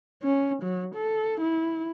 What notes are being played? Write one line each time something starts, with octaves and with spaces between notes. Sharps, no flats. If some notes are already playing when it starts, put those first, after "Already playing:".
C#4
F#3
A4
E4